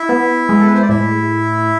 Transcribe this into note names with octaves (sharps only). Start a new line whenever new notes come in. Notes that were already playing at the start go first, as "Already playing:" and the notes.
Already playing: E4 E5
B3
G#3
A4
B4
C5
D5
A2 E4 E5